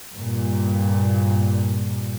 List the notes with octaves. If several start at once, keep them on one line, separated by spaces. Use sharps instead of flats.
G2 A#2